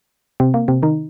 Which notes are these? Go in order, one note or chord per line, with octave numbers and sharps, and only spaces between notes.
C3 C4
A#3
C3 C4
D#3 D#4